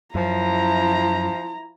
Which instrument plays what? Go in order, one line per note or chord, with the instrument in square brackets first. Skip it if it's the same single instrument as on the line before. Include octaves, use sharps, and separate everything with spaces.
[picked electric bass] F#2 [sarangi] F3 [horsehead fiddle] E4 A#5